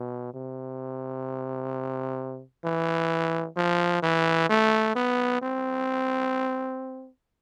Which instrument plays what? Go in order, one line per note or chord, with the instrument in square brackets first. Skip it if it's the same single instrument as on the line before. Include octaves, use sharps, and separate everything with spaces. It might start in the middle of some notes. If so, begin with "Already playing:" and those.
Already playing: [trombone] B2
C3
E3
F3
E3
A3
B3
C4